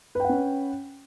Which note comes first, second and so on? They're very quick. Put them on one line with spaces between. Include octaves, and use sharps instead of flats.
B4 G5 F#5 C#4